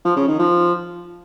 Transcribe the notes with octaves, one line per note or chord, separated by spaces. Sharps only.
F3
C#3
D#3
F3